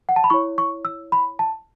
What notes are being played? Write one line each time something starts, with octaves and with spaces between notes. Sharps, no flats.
F#5
A5
B5
E4 C#5 C#6
C#6
E6
B5
A5